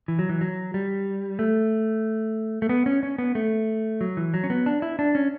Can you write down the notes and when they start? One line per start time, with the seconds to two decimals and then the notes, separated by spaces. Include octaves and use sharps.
0.08 E3
0.19 F#3
0.29 E3
0.41 F#3
0.74 G3
1.39 A3
2.62 A3
2.69 B3
2.86 C#4
3.03 C#4
3.18 B3
3.35 A3
4.01 F#3
4.17 E3
4.34 F#3
4.44 C#4
4.50 B3
4.66 D4
4.82 E4
4.99 D4
5.15 C#4